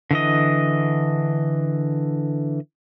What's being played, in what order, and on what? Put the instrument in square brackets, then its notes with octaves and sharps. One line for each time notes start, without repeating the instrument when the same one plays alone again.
[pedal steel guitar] D3 E3 D#5